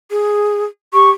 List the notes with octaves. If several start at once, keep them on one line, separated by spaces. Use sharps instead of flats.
G#4
G4 C#6